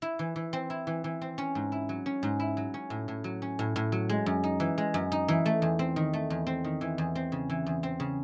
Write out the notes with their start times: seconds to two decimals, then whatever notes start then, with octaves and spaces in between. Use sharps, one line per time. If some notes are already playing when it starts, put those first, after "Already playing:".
0.02 E4
0.19 E3
0.36 E3
0.53 C4
0.70 E4
0.87 E3
1.04 E3
1.22 C4
1.38 C#4
1.55 G#2
1.72 E4
1.89 F#3
2.06 C#4
2.23 G#2
2.40 E4
2.57 F#3
2.74 C#4
2.90 A2
3.08 A2
3.24 F#3
3.42 C#4
3.59 A2
3.76 A2
3.92 F#3
4.09 G#3
4.26 F#2
4.44 D#4
4.60 E3
4.78 G#3
4.94 F#2
5.12 D#4
5.28 E3
5.46 A3
5.62 E2
5.79 C4
5.96 D#3
6.13 A3
6.30 E2
6.47 C4
6.64 D#3
6.81 E3
6.98 E2
7.15 C4
7.32 C#3
7.50 E3
7.66 E2
7.83 C4
8.00 C#3